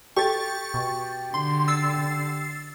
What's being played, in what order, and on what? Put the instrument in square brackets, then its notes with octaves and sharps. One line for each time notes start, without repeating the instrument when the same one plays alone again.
[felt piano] G4 [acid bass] A4 [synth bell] C#6 A6
[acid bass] B2
[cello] D3 [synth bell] C6
[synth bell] E6 A6 C7